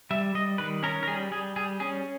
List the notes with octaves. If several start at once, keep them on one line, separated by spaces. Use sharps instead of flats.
G3 E5
G3 D#5
D#3 B4
C#4 A#4
A#4
G3 G#4
G3 G#4
G3 G#4
C#4 G#4